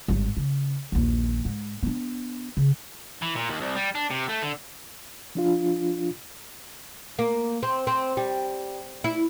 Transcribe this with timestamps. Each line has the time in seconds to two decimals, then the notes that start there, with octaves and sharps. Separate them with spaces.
0.08 G#1 G2
0.37 C#3
0.92 A#1 D#2
1.45 G#2
1.83 B3 D4
2.57 C#3
3.22 E3
3.36 A#2
3.50 D#2
3.61 C2
3.76 G3
3.95 D4
4.10 C3
4.29 A3
4.42 D3
5.35 F3 D4 F4
7.19 A#3
7.63 C4
7.87 C4
8.17 G3
9.04 E4